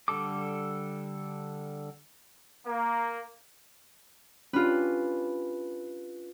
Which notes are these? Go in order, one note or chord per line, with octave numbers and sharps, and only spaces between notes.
D3 G3 A4 D6
A#3
C#4 D4 F4 G4 B4